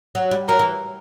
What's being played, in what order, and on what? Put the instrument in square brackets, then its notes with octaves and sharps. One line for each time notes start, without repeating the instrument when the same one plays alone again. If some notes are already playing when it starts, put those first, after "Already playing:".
[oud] F#3
G3
[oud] F#3 [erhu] A#4
[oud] E3